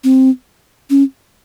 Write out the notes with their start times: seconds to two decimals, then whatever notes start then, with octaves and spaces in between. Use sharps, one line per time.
0.04 C4
0.90 C#4